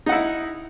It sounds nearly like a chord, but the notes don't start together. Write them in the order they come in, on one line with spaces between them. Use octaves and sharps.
D#4 F#5 E4